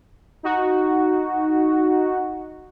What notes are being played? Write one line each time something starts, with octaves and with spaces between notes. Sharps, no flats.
D#4 F#4